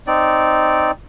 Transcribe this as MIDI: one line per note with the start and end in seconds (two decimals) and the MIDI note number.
0.07 0.91 60
0.07 0.91 63
0.07 0.91 74